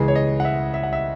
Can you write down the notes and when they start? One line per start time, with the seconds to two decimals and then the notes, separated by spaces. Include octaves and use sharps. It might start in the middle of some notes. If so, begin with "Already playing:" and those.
Already playing: C#2 C#3 E3 G#3 G#4
0.08 C#5
0.15 D#5
0.40 F#5
0.45 E5
0.74 E5
0.83 F#5
0.93 E5